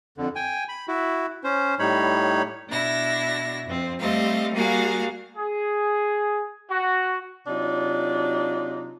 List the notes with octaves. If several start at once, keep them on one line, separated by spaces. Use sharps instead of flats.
F2 D3
G5 G#5
B5
E4 F#4
C#4 C5
A2 G3 D#4 C#5 B5
B2 D4 E4 A#6
F2 C4
G3 A3 C4 D#5 F5
G3 A#3 F#4 G#4 F5
G#4
F#4
C3 F#3 D4 D#4 F4